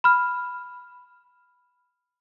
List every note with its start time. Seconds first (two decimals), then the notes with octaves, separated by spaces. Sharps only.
0.04 B5 F6